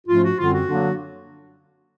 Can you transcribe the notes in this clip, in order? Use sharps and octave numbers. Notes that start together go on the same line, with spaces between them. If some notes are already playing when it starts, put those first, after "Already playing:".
G#2 F3 A3 C#4 F4
F#4
F#2 D3 G3 C4 F4
F#4
D3 F#3 A#3 D4